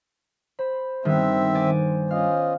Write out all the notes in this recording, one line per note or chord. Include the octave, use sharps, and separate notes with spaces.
C5 B5
G2 D#3 B3 C4 E5
D5 G#5
C#4 F4 D#5 F5